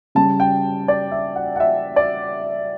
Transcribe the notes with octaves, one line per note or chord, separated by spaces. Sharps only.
C#3 G3 A5
G5
D5
E5
F#5
F#5
E5
D5